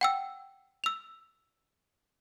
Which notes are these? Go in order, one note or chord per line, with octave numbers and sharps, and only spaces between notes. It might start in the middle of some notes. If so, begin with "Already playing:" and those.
F#5 G5 E6
E6 F7